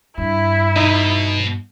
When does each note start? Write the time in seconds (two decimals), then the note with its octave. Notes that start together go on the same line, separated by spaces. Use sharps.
0.17 G2 E4
0.76 B2 D#4